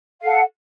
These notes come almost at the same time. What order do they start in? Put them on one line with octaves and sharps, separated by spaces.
F5 A4 F#5